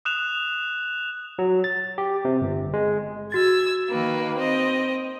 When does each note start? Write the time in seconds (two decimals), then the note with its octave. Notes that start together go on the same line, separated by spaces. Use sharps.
0.05 D#6 F#6 E7 F7
1.39 F#3
1.64 A6
1.98 G4
2.25 C3
2.41 G1
2.74 G#3
3.32 F#4 E6 G#6 A6
3.89 D#3 A#3 B4
4.36 C4 D#5